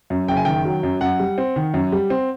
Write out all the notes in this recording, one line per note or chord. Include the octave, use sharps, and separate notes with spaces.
F#2
F#1 G5
G#5
D#3 G5
F#3
F#2
F#2 F#5
G3
C4
D#3
F#2
G3
C4